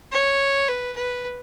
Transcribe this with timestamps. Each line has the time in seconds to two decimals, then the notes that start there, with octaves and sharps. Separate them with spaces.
0.12 C#5
0.68 B4
0.96 B4